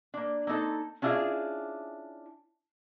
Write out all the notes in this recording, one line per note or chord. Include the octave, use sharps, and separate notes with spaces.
A#3 D4
A#3 C4 D#4 A4
C#4 D4 E4 F4 G#4 D#5